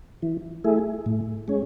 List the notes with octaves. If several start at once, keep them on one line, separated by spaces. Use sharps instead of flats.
E3
A3 E4 G#4
A2
G#3 C#4